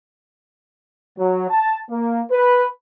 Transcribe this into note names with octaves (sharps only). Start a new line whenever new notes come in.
F#3
A5
A#3
B4